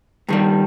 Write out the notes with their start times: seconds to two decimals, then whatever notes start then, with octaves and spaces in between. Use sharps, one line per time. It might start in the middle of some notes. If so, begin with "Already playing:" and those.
0.28 G2 D#3 G3